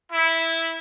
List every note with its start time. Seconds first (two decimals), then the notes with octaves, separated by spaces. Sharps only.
0.11 E4